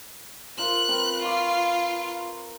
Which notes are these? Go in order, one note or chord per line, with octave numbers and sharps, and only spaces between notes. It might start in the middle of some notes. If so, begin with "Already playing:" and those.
F4 A#4 C5 F#6
C4 A#4 B4
F4 C#6 D6